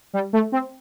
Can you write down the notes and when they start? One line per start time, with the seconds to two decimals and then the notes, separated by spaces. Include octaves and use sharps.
0.13 G3
0.33 A3
0.52 C4